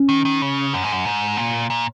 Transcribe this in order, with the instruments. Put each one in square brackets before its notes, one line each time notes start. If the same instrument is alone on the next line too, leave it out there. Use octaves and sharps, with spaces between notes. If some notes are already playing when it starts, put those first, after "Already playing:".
Already playing: [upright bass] C#4
[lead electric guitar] D#3
D#3
C#3
F#2
G#2
F#2
G#2
A#2
A#2